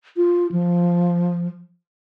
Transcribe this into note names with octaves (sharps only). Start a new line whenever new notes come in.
F4
F3